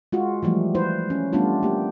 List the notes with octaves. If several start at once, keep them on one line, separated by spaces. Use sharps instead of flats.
G#3 F4 F#4
E3 F3 G3 A3
E4 B4 C5
C#4
G3 A3 B3 D4 F4
A#3 G4